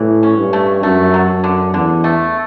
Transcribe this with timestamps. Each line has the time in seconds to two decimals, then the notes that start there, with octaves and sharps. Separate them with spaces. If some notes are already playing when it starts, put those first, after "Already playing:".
Already playing: A2 E3
0.23 C#4
0.38 G2
0.53 A3
0.83 F#2 A3
1.14 F#3
1.29 F#2
1.44 D3
1.74 E2 D3
2.04 A3